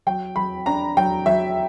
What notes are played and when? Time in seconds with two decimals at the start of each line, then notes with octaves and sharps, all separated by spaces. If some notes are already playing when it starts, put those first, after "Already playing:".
0.07 F#3 G5
0.36 F#3 B5
0.66 D4 A#5
0.97 F#3 G5
1.26 F#3 E5